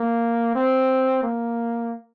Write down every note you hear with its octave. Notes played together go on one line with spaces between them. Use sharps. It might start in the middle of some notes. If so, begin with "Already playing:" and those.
Already playing: A#3
C4
A#3